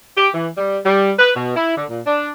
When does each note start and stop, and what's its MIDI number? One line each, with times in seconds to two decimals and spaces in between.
0.17 0.30 67
0.34 0.49 52
0.57 0.79 55
0.85 1.12 55
1.19 1.31 71
1.35 1.54 47
1.56 1.74 64
1.77 1.85 50
1.90 2.01 46
2.06 2.31 62